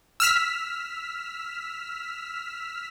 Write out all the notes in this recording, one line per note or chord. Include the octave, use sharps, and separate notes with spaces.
E6 F6 B6